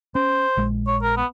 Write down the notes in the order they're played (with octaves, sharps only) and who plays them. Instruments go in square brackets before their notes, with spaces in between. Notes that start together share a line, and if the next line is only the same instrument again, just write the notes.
[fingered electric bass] C#4 [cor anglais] C5
[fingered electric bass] A#1 G#3
[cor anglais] C#5
A#4
B3